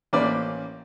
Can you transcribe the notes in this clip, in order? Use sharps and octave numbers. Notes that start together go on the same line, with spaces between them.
A1 A#3 C4 C#4 B4 D5